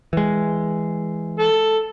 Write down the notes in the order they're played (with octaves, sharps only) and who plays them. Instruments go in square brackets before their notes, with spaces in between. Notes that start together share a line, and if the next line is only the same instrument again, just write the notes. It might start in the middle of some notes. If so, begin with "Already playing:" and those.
[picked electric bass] E3 G#3
[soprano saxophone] A4